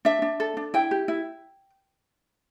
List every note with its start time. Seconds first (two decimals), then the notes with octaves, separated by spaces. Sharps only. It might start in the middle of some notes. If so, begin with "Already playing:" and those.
0.05 D4 E5
0.22 D4
0.40 A4
0.57 D4
0.74 E4 G5
0.91 G4
1.08 E4